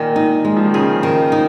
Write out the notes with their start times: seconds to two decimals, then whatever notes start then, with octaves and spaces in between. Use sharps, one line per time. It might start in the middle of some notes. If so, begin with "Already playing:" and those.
Already playing: A#2 D#3
0.16 D#4
0.45 G#3
0.56 F3
0.66 D#3
0.74 C#3 G#4
1.03 D#3
1.32 D#4